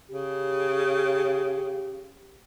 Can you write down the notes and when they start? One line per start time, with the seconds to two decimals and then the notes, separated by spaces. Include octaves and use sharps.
0.11 C#3 G4